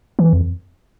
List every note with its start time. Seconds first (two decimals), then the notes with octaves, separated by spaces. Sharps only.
0.19 E3
0.33 F2